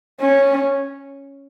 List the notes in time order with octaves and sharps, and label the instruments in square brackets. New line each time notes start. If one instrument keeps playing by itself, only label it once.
[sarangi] C#4